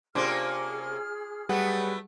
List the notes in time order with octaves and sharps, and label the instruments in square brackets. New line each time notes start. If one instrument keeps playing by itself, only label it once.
[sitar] C3 A#3 C#4 [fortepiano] D4 F4 C5 [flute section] G#4 F6
[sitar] F#3 A3 B3 [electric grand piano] G3 G#4 F#5 [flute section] B4